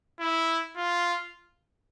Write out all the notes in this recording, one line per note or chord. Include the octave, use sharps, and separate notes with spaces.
E4
F4